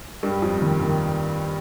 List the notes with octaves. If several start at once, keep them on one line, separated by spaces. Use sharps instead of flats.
G2 G3
F2 F3
D#2 D#3
D#2 D#3